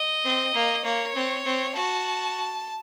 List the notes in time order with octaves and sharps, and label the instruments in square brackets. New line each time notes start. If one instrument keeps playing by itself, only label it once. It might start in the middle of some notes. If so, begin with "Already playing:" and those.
Already playing: [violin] D#5
[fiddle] C4
A#3
[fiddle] A#3 [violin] C#5
[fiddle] C4
C4
[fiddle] F#4 [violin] A5